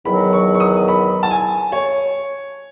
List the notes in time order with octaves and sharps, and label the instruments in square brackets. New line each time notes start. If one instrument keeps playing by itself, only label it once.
[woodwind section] E2 D#3 F#3 [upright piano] B5
[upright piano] C#6
C#6
D#6
B5
A5
G#5
C#5